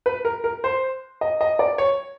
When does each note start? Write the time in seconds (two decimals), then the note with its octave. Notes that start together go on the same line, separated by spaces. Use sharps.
0.06 B4
0.25 A#4
0.44 A#4
0.64 C5
1.21 D#5
1.41 D#5
1.59 D5
1.78 C#5